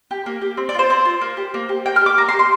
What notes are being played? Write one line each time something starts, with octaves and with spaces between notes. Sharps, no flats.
G4
A#3
G4
C4
D5
F4 C5
C4 C5
F4
A#3
G4
A#3
G4
A#3 G5
F6
G4
D6
A#3 A#5
C6
G4
C6